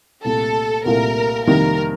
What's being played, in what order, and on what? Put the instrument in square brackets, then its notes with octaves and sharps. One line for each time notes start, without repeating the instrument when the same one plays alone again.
[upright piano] C2 A#2 A3 [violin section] A4
[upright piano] C2 A#2 A3 [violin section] A#4
[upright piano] F2 C3 D#3 G3 A#3 [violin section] A#4